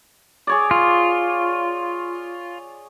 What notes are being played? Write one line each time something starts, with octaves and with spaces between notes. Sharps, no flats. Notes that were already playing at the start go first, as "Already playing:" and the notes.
G#4 C#5 D5
F4